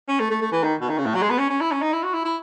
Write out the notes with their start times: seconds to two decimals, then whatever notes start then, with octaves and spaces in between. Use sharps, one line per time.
0.09 C#4
0.20 A3
0.31 A3
0.42 A3
0.52 E3
0.63 D#3
0.81 B2
0.90 D#3
0.98 C#3
1.06 A2
1.15 F#3
1.22 G#3
1.31 B3
1.39 C#4
1.50 C#4
1.61 E4
1.72 C#4
1.82 D#4
1.93 E4
2.04 F#4
2.14 E4
2.25 E4